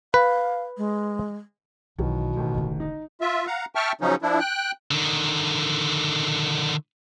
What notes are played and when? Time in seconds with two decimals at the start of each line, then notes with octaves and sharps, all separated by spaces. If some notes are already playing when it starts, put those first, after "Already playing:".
0.14 B4 F5
0.77 G#3
1.98 B1 B2 D#3 E3 F#3
2.36 A1 D#3
2.54 E1 D3
2.80 D#4
3.21 F4 E5
3.47 F5 F#5 A#5
3.75 E5 G5 A5 C#6 F6
4.01 C#3 F3 F#3 C#4 D#4
4.22 F3 D4 E4
4.40 G5 F#6
4.91 D3 D#3